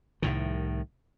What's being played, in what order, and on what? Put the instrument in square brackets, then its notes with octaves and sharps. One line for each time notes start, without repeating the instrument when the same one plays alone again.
[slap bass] C2 A2 D#3